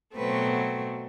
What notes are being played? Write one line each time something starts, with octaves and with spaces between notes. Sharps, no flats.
B2 F#3 A3 C4 B4